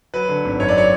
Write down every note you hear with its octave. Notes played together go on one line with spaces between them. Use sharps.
F#3 B4
D3
G#1
F#2 C#5
D5
F#3 C#5